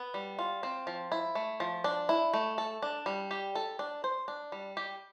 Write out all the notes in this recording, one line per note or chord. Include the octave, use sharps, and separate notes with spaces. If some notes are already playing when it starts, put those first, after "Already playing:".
Already playing: B3
G3
F4
C4
F3
E4
A3
F3
D4
E4
A3
A4
D4
G3
G4
A4
D4
C5
D4
G3
G4